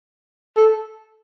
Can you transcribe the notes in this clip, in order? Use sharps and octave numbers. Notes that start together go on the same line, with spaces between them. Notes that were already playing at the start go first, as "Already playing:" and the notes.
A4